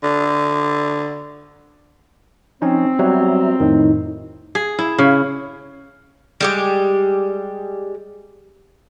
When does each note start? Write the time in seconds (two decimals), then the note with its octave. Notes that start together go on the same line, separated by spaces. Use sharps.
0.03 D3
2.62 F3 C4 C#4 D#4
2.99 F#3 G3 B3 F#4 E5 A#5
3.60 F2 A2 D#3 D#4
4.55 G#4
4.79 E4
4.98 C#3
6.41 G3 G#3 G4